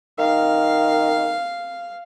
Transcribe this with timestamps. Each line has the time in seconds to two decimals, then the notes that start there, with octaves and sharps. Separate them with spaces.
0.18 D#3 F5